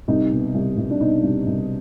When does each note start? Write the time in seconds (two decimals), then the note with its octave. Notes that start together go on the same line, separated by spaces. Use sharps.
0.08 C2 D#4
0.31 B2
0.54 C2
0.77 C2
0.91 D4
1.00 B2 D#4
1.23 C2
1.46 C2